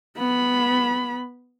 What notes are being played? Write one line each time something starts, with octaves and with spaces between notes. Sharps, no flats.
B3 B5